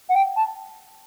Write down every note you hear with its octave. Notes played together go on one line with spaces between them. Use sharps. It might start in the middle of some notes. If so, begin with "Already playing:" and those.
F#5
G5
A5